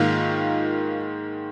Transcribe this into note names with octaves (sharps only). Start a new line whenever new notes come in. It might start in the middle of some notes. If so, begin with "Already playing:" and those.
Already playing: G#2 D#3 A#3 F4